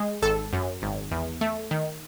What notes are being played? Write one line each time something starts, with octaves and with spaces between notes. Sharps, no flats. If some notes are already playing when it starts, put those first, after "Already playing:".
Already playing: G#3
G#1 A4
F#2
G#1
E2
A3
D#3